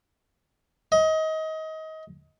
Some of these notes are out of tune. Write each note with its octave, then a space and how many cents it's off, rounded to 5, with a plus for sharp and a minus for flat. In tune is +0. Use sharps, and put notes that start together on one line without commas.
D#5 +25